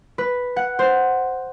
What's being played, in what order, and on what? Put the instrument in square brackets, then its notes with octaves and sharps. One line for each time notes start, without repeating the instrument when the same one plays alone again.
[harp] B4
F#5
C5